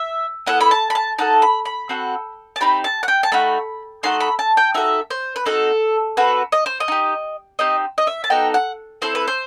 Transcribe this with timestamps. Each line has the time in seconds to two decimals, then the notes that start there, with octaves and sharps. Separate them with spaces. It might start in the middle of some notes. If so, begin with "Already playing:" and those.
Already playing: E5
0.46 B3 E4 A4 F#5
0.61 B5
0.71 A5
0.90 B5
0.95 A5
1.18 D#4 F#4 A4 A5
1.42 B5
1.65 B5
1.89 C4 F#4 A4
2.56 A5
2.60 C4 D#4 G4 B5
2.84 A5
3.03 F#5
3.08 G5
3.23 A5
3.32 A3 D#4 F#4 B5
4.03 A3 D#4 F#4 A4 C6
4.20 B5
4.39 A5
4.57 G5
4.74 D#4 F#4 A4 E5
5.10 C5
5.36 B4
5.46 C4 D#4 F#4 A4
6.17 C4 F#4 A4 B4
6.52 D#5
6.66 C5
6.80 D#5
6.88 D#4 G4
7.59 C4 D#4 G4 D#5
7.98 D#5
8.07 E5
8.24 A5
8.30 B3 D#4 F#4 A4 G5
8.54 F#5
9.02 C4 E4 A4 C5
9.15 B4
9.28 C5